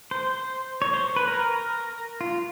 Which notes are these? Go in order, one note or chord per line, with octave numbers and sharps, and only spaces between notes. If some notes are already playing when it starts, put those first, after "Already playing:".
C5
C#5
C5
B4
A#4
F4